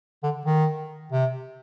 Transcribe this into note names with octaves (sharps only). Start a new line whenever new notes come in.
D3
D#3
C3